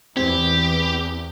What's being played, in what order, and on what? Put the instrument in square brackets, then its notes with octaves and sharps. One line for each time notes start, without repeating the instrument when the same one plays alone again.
[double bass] E2 E3 [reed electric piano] C4 [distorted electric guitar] G4